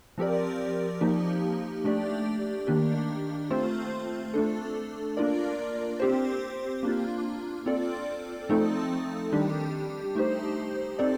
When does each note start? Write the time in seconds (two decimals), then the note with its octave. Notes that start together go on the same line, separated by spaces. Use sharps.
0.18 F3 C4 G4 A#4 D5
1.01 F3 A#3 D#4 G4
1.84 A3 D4 G4 D5
2.67 D#3 A#3 D4 G4
3.50 A3 C4 F4 C5
4.34 A3 D4 A4
5.17 A#3 D4 F4 A#4 D5
6.00 C4 G4 C5
6.83 A#3 D4 F4
7.66 C4 F4 A4 D5
8.49 F3 A3 C4 D#4 A4
9.32 D#3 G3 D4 G4
10.15 A3 D#4 G4 C5
10.99 C4 D#4 A4 D5